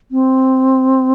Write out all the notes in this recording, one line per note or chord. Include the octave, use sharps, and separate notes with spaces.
C4